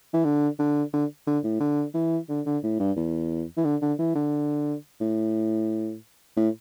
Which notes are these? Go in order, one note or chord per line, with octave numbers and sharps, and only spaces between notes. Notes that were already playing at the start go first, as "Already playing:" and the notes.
E3
D3
D3
D3
D3
A2
D3
E3
D3
D3
A2
G2
E2
E3
D3
D3
E3
D3
A2
A2